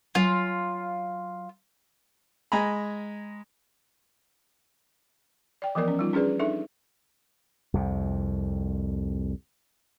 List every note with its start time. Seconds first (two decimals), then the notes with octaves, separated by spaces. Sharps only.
0.15 F#3 F4 C#5 G#5
2.52 G#3 G#5 A#5 B5
5.62 D5 G5
5.75 E3 F3 B3 A#4 D5
5.88 C#4
5.99 G3 D#4 F4
6.13 C#4 D4 G#4 B4 D5
6.39 D4 D#4 A4 E5
7.74 C2 F2 C3